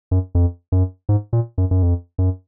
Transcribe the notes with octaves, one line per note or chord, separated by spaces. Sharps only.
F#2
F2
F#2
G#2
A#2
F#2
F#2
F2
F#2